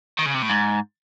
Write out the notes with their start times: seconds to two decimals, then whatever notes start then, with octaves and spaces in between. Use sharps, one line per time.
0.19 D#3
0.26 C#3
0.34 C3
0.42 A2
0.50 G#2